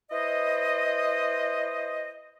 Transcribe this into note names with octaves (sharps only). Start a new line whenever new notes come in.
E4 B4 C5 D#5